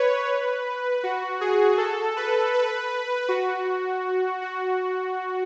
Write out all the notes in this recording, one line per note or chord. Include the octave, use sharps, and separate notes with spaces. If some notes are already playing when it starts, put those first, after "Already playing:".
Already playing: B4 C#5
F#4
G#4
A4
B4
B4
F#4
F#4